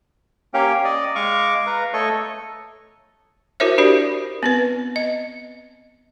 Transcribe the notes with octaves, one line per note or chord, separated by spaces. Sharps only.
A#3 C#4 G4 C#5 F5 G5
D5 D#5
G#3 F5 C#6 D6
B4 F5 A#5
A3 A4 C#5 D#5 C#6
E4 F#4 A#4 C5 C#5 E5
D4 F#4 G4 A#4 C5 D5
B3 C4 B4
D#5